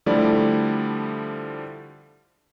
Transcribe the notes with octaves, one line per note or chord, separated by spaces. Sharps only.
D3 F3 G3 A3 E4 D5